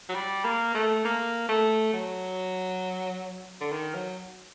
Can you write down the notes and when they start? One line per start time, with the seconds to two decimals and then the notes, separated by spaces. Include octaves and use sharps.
0.09 F#3
0.15 G3
0.44 A#3
0.74 A3
1.05 A#3
1.49 A3
1.93 F#3
3.61 D3
3.72 D#3
3.94 F#3